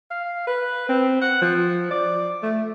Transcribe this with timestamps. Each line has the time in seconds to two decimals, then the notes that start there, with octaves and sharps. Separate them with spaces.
0.11 F5
0.47 B4
0.89 C4
1.22 F#5
1.42 F3
1.91 D5
2.43 A3